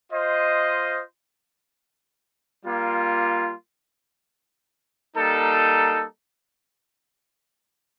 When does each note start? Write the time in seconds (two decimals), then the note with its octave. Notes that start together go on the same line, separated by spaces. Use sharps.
0.12 F4 C5 D#5
2.65 G3 A#3 F4
5.16 G3 A#3 D#4 A4